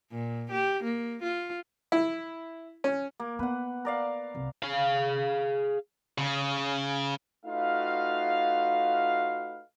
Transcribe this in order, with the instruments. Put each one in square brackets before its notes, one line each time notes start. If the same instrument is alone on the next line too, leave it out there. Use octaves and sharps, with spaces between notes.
[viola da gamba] A#2
G4
A#3
F4
[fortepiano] E4
C#4
[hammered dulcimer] A#3
[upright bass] B3 [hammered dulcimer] B4 F#5
[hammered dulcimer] A#4 D5 F5
[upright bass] C2
[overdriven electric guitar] G#4 F5
[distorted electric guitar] C#3
[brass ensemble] A3 D#4 F4 F#4 B4 F5